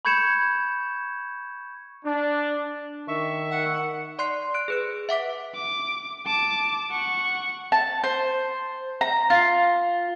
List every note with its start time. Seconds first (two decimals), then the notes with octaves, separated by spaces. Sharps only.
0.05 B5 C#6 G6 G#6 C#7 E7
2.05 D4
3.08 D#3 E5 C#6
3.50 F#5
4.19 D5 C6 F#6 C7
4.54 F#6 D7
4.68 G#4 B4 F#6
5.09 E5 F#5 D6 B6
5.55 D6
6.26 A5 D6
6.90 F#5 C#6
7.72 A5
8.04 C5
9.01 A#5
9.30 F4